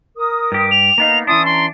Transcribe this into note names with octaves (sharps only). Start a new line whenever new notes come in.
A#4 D#6
G2 G4
F7
A#3 B3 D#4 F5
E3 C#4 D4 E4 C6 D#6
A#5 C6